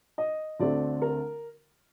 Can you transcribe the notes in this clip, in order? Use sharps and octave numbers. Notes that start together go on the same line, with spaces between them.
D#5
D2 D3 A3 C4 D5
A#4